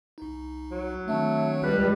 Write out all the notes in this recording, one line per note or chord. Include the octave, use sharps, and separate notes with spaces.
C2 D#4
F#3
D#3 A3 C4 D4
C#2 G3 B4